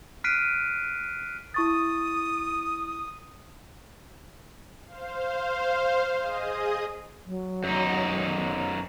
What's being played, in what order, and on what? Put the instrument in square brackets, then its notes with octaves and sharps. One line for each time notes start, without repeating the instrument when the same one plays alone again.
[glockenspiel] F6 F#6 B6 C7 D7 D#7
[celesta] E4 C#6 A6 [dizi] D#6
[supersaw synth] C5 F5
G#4 D#5 D#6
[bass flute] F#3
[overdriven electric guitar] F#2 D#4